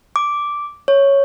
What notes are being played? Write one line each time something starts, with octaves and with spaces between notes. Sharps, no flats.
D6
C#5